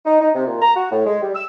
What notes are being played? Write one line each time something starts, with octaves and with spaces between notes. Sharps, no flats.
D#4
D#4
C3
A#2
A#5
F#4
A2
G#3
G3
E6